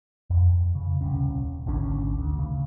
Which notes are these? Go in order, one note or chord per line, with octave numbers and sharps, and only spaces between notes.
F2
C#3
D#1 C2 C#4
G#1 D2 D3 C#4
D2
C#3